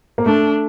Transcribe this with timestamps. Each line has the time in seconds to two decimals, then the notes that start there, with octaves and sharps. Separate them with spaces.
0.18 A#3
0.26 A3 D4